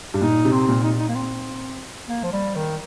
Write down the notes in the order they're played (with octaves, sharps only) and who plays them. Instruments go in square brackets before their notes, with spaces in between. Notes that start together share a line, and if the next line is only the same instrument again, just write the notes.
[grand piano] G2
[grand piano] A#2 [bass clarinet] D#4
[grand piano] C3
[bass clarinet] C4
[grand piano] A#2
[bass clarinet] D#4
D#4
A#3
C4
A#3
F3
G3
D#3